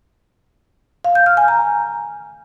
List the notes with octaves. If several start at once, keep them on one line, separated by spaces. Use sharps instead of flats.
F5
G6
F6
G#5
A#5